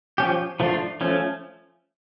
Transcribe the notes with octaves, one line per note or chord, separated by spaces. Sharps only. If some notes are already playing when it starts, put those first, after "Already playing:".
F3 C#4 G4
F3 A3 D4 F4
F3 A3 C#4